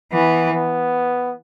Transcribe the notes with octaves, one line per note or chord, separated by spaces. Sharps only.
E3 B3
B3